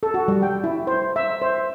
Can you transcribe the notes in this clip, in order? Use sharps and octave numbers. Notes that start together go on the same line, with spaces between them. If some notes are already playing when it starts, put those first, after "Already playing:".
A4
F#4
G3
G5
E4
C5
E5
C5